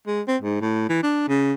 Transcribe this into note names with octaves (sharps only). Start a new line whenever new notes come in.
G#3
C4
G#2
A2
E3
D4
C#3